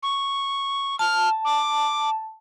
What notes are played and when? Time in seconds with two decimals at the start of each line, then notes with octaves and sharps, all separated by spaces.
0.03 C#6
0.99 A5 F6
1.45 D6